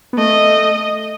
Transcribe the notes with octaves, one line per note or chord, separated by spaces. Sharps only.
B3
A3 D#5